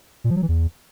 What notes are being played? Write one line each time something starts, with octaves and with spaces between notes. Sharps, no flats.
A#2
F3
F#3
E3
E2